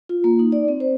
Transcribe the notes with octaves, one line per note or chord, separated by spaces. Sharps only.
F4
A#3
D#4
D5
C4
C5